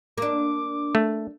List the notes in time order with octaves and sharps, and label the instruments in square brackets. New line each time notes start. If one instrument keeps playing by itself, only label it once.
[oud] A#3 D4 [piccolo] D6
[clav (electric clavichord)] A3